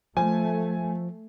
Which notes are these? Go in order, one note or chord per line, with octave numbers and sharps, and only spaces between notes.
F3 A3 G#5